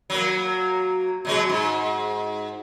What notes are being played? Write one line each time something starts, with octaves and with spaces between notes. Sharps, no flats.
F#3 A#3
B2 F#3 G#3
G#2